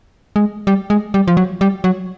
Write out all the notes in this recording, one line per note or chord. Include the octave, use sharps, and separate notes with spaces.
G#3
G3
G#3
G3
F3
F#3
G3
F#3